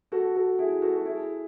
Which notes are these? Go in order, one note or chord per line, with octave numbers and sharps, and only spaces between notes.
F#4 A4
F#4 A4
E4 G#4
F#4 A4
F#4
E4 G#4